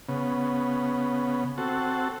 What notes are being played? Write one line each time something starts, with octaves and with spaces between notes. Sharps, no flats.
C#3 B3
C4 F#4 A4